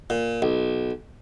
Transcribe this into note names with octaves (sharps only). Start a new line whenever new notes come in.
A#2
B1